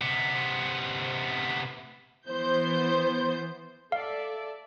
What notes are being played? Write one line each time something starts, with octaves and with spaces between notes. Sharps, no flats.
C3 B3
E3 B3 C5 G6
A4 D5 E5 F5